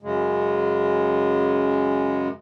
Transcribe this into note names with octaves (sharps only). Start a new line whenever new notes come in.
F#2 C#3 G#3